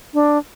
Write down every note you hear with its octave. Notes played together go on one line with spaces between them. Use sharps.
D4